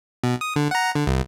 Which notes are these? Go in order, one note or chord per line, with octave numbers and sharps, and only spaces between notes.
B2
D#6
D3
F#5 A#5
D3
C2